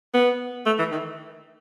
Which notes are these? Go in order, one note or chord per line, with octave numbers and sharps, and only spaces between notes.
B3
A3
E3
D#3